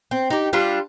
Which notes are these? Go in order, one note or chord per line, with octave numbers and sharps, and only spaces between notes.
C4
D#4 G4
G3 D4 F4